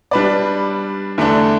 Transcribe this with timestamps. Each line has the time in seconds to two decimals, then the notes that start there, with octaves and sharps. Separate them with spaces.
0.11 G3 D4 B4 D5
1.18 E2 D3 A3 D4